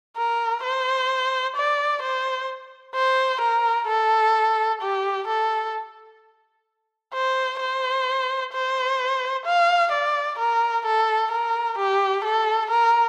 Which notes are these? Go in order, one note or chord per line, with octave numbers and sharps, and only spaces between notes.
A#4
C5
D5
C5
C5
A#4
A4
G4
A4
C5
C5
C5
F5
D5
A#4
A4
A#4
G4
A4
A#4